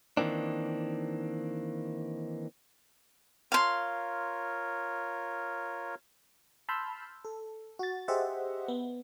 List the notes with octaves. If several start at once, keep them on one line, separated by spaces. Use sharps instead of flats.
D#3 E3 A#3 C4 D4
F4 A#4 C#5 F5 C6
A5 B5 C6 E6 F6 G6
A4
F#4 A6
G4 G#4 C5 D#5 E5 F#5
B3